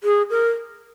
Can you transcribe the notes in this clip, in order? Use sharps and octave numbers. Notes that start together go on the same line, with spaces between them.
G#4
A#4